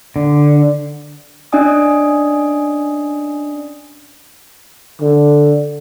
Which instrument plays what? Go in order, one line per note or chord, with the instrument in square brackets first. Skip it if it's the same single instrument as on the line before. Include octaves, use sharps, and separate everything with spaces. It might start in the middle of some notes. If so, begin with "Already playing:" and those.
[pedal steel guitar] D3
[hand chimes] C#4 D4 D5 D#5 G#5 D#6
[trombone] D3